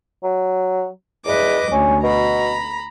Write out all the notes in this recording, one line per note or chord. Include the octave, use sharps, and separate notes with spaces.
F#3
E2 B4 D#5 D6
D2 C#4
B2 A#5 B5